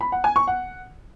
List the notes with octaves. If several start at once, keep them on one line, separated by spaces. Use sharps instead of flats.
B5
F#5
G#5
C#6
F#5